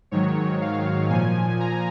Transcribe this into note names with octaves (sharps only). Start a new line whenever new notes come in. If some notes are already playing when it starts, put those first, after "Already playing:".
G#2 D#3 F#3 C#5
F5
A#2 F3 G#5
A#5